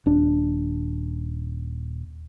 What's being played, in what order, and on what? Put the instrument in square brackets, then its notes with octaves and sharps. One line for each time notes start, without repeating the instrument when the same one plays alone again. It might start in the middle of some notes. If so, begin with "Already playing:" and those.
[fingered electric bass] D#1 D4